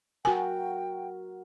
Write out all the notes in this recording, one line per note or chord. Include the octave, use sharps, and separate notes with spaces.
F#4 A#4 G5 G#5